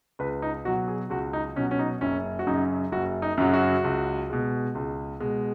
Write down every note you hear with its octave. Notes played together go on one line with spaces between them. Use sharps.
C#2 B4
D#4
B2 F#3 F#4
G#4
C#2 F#4
D#4
B2 F#3 C#4
C#4
D#4
F#1 C#4
F#4
F#2 C#3 F#3 D#4
F#1 F#4
D#4
F#2 C#3 F#3
F#4
C#2
B2 G#3
C#2
B2 G#3